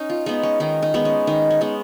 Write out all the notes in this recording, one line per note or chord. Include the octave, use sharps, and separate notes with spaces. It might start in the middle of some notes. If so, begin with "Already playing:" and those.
Already playing: C#4 D#4
F4
G#3 B3 D#4
C#4
D#3 D#4
D#4
G#3 B3
C#4
D#3 D#4
C#4
G#3 B3